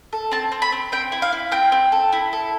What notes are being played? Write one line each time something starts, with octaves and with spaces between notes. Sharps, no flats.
A4
C4 A5
C4
B5
C4
C4 G5
E4
F5
E4
C4 G5
C4
A4
E4
A4